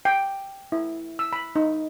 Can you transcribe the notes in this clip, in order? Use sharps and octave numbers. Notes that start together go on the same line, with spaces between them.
G5
E4
E6
B5
D#4